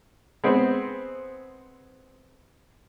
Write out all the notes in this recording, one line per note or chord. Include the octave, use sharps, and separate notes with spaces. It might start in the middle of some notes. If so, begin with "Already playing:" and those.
G#3 B3 C4